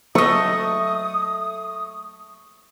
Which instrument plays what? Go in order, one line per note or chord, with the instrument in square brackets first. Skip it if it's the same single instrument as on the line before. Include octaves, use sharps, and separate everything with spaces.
[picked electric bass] F#3 [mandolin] A3 D#5 [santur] C#6 [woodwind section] D#6